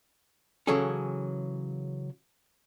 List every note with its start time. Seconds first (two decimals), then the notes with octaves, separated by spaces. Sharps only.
0.67 C#3 E3 F#3 C#4 G#4 A4